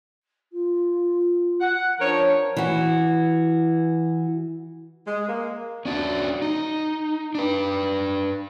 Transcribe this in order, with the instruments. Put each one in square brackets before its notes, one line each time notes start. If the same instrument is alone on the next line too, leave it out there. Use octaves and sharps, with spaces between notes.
[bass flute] F4
[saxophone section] F#5
[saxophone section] F3 A#4 C#5 [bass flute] D4
[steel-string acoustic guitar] E3 F#4
[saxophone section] G#3
A#3
[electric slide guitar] C#4 D4 F#4
D#4
D4 B4